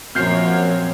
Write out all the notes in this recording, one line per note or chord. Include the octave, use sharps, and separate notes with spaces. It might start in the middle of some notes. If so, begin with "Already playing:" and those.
F#2 A#2 F3 C4 C#5 F6 G6 C7